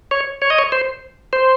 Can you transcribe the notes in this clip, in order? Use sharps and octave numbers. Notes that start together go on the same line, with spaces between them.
C#5
C#5
D#5
C#5
C5
C5